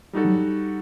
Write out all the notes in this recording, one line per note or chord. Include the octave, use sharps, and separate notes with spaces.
G3 D#4 F#4 A4
F#3